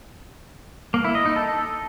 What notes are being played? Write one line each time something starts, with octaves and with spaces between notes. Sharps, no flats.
A#3
E4
D#5
D#4
A4